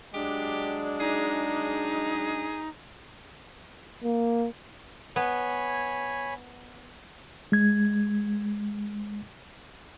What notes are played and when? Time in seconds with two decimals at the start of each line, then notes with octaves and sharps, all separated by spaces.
0.14 F#3 G#3 D4 G4
1.00 D#4 G#4
4.04 A#3
5.16 B3 C#5 G#5 B5
7.52 G#3 G#6